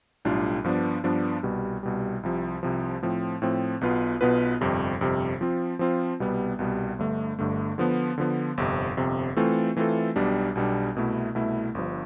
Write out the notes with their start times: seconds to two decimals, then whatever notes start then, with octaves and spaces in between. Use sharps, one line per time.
0.25 B1 A2 G3 D4 F4
0.64 G2 F3 B3 D4
1.04 G2 F3 B3 D4
1.43 C2 B2 G3
1.83 C2 B2 G3
2.23 C2 C3 F3
2.63 C2 C3 F3
3.03 A2 F3 C4
3.42 A2 F3 C4
3.81 B1 B2 B3 F4 B4
4.21 B1 B2 B3 F4 B4
4.61 G1 F2 C3 G3
5.01 G1 F2 C3 G3
5.41 F3 C4 F4
5.79 F3 C4 F4
6.20 C2 B2 G3 B3
6.59 C2 B2 G3 B3
6.98 G1 G2 D3 A3
7.39 G1 G2 D3 A3
7.78 D3 F3 B3
8.18 D3 F3 B3
8.57 G1 F2 C3
8.97 G1 F2 C3
9.37 E3 A3 C4 F4 A4
9.76 E3 A3 C4 F4 A4
10.16 B1 B2 G3 D4
10.55 B1 B2 G3 D4
10.95 C2 B2 A3 E4
11.35 C2 B2 A3 E4
11.75 G1 G2 F3